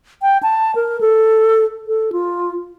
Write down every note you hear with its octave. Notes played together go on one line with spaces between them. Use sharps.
G5
A5
A#4
A4
A4
F4